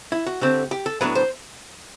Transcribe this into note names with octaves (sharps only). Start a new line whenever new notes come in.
E4
F#4
D3 A3 C4 G4
G4
A4
A2 F#3 B3 D4 B4
C5